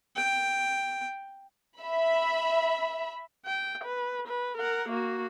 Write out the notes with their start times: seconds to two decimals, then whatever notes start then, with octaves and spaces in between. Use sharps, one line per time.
0.16 G5
1.80 E5 B5
3.46 G5
3.84 B4
4.28 B4
4.58 A#4 F#5
4.89 A#3 F#4